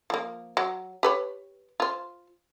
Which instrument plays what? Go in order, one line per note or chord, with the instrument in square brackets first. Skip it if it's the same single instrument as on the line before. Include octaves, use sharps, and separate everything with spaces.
[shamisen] F3 A#3
F#3
G4 B4 C#5
F4 C5